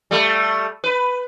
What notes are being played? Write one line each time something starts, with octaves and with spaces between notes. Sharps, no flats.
G3 A3
B4